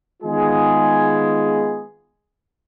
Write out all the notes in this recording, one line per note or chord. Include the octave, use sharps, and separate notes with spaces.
D#3 G#3 B3 F4 G#4